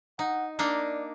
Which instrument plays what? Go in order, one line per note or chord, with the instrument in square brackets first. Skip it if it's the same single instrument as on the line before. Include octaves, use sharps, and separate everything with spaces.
[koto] D#4 [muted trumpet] F#5
[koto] A#3 D4 D#4 [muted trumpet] D5